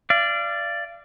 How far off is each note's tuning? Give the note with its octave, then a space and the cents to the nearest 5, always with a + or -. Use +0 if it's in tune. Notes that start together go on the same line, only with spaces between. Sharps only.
D5 +0 F5 -35